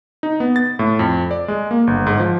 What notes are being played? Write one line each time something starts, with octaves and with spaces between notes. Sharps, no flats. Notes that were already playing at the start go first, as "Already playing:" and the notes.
D#4
B3
A6
A2
F2
D5
G#3
A#3
G1
G#2
F3